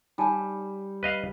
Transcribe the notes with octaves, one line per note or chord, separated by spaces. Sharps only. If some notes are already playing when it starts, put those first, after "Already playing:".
G3 D#4 G#5 A5
B4 D#5 F5